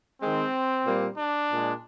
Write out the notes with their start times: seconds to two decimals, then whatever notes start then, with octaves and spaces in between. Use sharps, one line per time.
0.21 D#3 G#3 C4
0.85 A#2 G3 A#3
1.17 D4
1.49 A#2 G#3